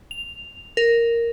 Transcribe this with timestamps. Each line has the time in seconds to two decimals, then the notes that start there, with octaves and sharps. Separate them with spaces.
0.11 F7
0.77 A#4